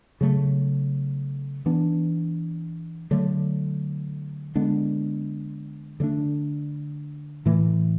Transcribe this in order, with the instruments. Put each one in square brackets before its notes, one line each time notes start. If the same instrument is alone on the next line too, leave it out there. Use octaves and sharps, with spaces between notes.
[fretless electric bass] C#3 F#3 A3
E3 B3 D4
D3 F#3 A3
D3 G#3 B3 D4
D3 F#3 A3 D4
A2 E3 A3